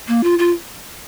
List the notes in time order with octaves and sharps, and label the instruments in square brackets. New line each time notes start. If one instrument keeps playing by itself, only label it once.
[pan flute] A#3
F4
F4